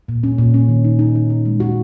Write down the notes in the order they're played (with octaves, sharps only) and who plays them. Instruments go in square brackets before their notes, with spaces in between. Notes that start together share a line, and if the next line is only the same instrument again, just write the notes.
[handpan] A#2
C#4
A#2
C#4
D#3
D#4
D#4
D#4
D#4
G#3
F#4